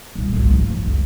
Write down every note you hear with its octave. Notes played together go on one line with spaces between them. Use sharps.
A#2 G3
G#1 C#2
F3
F#1
C#2